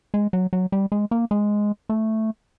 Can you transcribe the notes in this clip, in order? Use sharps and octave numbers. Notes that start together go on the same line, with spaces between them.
G#3
F#3
F#3
G3
G#3
A#3
G#3
A3